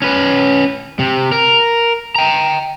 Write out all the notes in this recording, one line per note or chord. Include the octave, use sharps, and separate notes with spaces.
C#4 B4
C3
A#4
G5 A#5